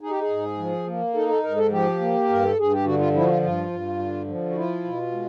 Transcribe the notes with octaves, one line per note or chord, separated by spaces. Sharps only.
D#4 G#4
G4
G#4
G#2
F3
A#3
D#4 A4
A4
G#2 A#4
A4
F3 G4
A#3
G2 A#4
A4
G2 G#4
G4
D3 F#4
F4
F3 E4
F#4
F4
G2 F4
G2
D3
F3
F#4
E4 F4
B2
G#3